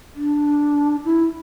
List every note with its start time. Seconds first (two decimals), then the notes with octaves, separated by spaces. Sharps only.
0.15 D4
1.05 E4